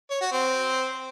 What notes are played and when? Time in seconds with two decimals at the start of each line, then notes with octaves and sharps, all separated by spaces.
0.11 C#5
0.21 F#4
0.32 C4